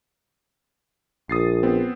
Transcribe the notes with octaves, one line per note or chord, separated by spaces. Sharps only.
A#1 D#6 A6 C7
B3 C4